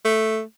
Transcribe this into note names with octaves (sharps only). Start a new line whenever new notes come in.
A3